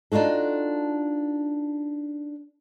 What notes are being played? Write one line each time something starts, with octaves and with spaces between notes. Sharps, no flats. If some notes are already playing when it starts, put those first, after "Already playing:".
D4 D#4 F4 F#4 A4